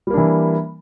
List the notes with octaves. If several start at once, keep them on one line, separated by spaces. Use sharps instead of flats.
E3 G3 A#3 D4